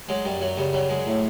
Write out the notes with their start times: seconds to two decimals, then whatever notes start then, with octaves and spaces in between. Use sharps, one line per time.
0.09 F#3 G#3
0.25 F#2 G3
0.41 F#2 F#3
0.57 C#3 G3
0.73 F#3 G3
0.89 F#2 G#3
1.06 A2